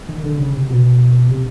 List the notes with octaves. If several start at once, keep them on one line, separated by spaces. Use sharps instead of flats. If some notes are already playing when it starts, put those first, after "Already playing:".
D#3
D3
C#3
C3
B2
C3